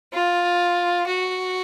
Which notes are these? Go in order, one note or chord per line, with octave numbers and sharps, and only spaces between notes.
F4
F#4